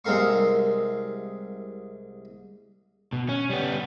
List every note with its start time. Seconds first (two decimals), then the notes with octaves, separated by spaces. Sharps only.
0.05 C2 G#3 C4 A#4 F5 C#6
3.13 B2
3.29 C#4
3.50 G3 B3